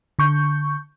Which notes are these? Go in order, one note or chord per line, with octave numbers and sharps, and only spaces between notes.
D3 C#6 G6